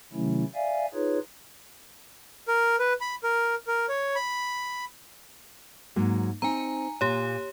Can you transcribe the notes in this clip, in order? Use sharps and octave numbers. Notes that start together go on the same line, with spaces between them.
C3 D#3 F#3 A3 C#4 E4
D5 E5 F5 G#5
D#4 F4 G#4 B4 C#5
A#4
B4
B5
A#4
A#4
C#5
B5
G#2 F#3 A#3
C4 D#4 G#5 A#5
A#2 G4 C#5